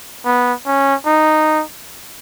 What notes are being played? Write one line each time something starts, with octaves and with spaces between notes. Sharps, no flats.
B3
C#4
D#4